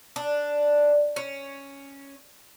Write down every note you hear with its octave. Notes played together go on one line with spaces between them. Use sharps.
D4
C#4